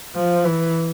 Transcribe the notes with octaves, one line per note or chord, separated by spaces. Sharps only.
F3
E3